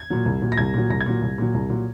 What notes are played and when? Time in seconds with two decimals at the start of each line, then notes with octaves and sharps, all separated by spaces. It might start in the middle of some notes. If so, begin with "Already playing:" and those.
Already playing: G#6
0.10 A#2 F#3
0.26 C2
0.42 A#2 F#3
0.52 A#6
0.57 C2 G#6
0.74 A#2 F#3
0.90 C2 A#6
1.01 G#6
1.06 A#2 F#3
1.22 C2
1.38 A#2 F#3
1.54 C2
1.70 A#2 F#3